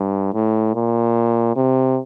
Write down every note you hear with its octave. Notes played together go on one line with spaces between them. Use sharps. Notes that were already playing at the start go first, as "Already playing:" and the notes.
Already playing: G2
A2
A#2
C3